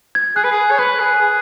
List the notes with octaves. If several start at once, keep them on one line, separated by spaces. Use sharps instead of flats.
G#6
G#4 F#6
B4
G#4
C#5
B4 F#6
G#4
G#4